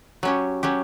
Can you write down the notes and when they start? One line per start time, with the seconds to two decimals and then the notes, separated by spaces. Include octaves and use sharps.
0.23 F#3 C#4 G4
0.63 F#3 C#4 G4